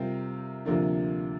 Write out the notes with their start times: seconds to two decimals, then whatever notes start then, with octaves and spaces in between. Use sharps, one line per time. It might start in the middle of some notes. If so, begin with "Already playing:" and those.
Already playing: C3 G3 C4 F4 A#4
0.65 D2 C3 F3 A#3 D4